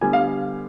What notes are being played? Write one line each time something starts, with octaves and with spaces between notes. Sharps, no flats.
D3 G3 B3 G#5
F5